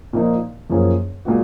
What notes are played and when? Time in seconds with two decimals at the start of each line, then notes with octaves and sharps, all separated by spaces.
0.13 A#2 F3 A#3 D#4
0.70 F#2 F3 A#3 C#4 G#4
1.25 A#2 G#3 B3 F#4